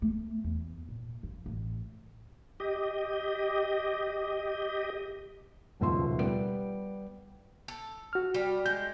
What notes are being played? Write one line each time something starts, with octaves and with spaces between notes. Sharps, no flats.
A3 B3
E2
A#2
F3
A1
G4 D#5
D#1 C#2 B2 F3 E5 C6
G3 B3 D7
A4
F#4 F6
G3
G#3 G6